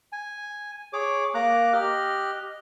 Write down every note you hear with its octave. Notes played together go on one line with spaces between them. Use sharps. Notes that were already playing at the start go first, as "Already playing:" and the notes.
G#5
G#4 C#5 D6
A#3 A#5 D6 F#6
G4 D#5 F6 F#6